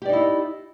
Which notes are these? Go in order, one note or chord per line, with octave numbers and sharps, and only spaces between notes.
D#4 E4 G4 D5